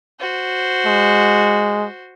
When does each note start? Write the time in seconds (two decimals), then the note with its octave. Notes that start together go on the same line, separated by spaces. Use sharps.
0.20 F#4 C5
0.86 G#3